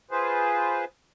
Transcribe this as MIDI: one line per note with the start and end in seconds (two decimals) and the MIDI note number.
0.11 0.85 65
0.11 0.85 68
0.11 0.85 71
0.11 0.85 72